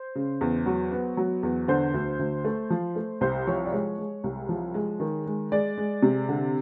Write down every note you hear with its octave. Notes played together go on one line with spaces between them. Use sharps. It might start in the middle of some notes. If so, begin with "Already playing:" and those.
Already playing: C5
C#3
E2
F#3
B3
F#3
E2
D3 C5
D2
D2
A3
F3
A3
C2 C5
F3 C#5
D5
G#3 C#5
G#3
C2
F3
G#3
D#3
G#3
G#3 D5
G#3
C3
D3